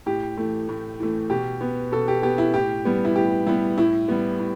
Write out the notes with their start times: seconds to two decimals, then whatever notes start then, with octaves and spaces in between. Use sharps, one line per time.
0.06 A2 G4
0.37 E3 A3
0.69 A2
1.00 E3 A3
1.30 B2 G4
1.61 B3
1.92 B2 A4
2.08 G4
2.22 B3 G4
2.38 E4
2.54 A2 G4
2.85 G3 B3
3.05 E4
3.16 A2 G4
3.46 G3 B3 E4
3.78 A2 E4
4.08 G3 B3
4.39 A2